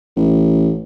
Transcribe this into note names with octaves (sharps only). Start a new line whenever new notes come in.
A1